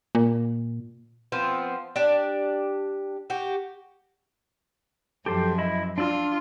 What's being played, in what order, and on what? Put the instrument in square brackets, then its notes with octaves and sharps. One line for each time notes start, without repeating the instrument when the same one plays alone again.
[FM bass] A#2
[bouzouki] F3 B3 C4
D4 G4 D5
F#4 G4
[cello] F#2 F3 [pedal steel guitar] G4 A4 C5
[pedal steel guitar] E4 D#5 B5
[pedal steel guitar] D4 D5 E6 [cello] F4